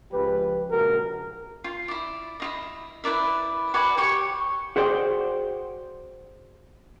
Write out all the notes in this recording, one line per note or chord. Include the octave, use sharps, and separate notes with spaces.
C#2 F3 G4 B4
A#1 C#3 G#3 F#4 A#4
F4
E4 D5
E4 F4 D#5
E4 B4 D5 E5
F#4 B4 D5 G#5
G4 C#5 C#6
F#4 G#4 C5 D5 F#5 G5